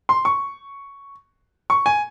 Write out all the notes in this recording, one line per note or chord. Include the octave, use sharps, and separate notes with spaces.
C6
C#6
C#6
G#5